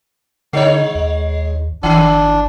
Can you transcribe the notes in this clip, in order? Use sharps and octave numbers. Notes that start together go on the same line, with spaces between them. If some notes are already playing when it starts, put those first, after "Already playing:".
D3 G#3 D#4 C#5
D#2
G1 D#3 D4